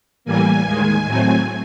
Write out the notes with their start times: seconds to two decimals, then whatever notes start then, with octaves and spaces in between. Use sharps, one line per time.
0.25 A2 E3 G3 A#3 G#5
0.65 D#2 D#3 G#3
1.06 A2 F#3 A3 C4